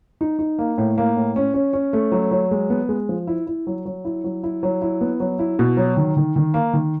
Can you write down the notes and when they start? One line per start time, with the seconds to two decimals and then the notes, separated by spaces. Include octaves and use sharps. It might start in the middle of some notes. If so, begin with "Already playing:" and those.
0.21 D#4
0.39 D#4
0.59 A#3
0.78 A2
0.98 A#3
1.16 A2
1.36 C#4
1.54 C#4
1.73 C#4
1.93 A3
2.12 F#3
2.31 F#3
2.51 G#3
2.70 B3
2.89 G#3
3.09 F3
3.27 E4
3.47 E4
3.67 F#3
3.85 F#3
4.05 E4
4.24 F#3
4.44 E4
4.63 F#3
4.82 E4
5.01 B3
5.20 F#3
5.39 E4
5.59 B2
5.77 F#3
5.97 D#3
6.17 D#3
6.36 D#3
6.54 A#3
6.73 D#3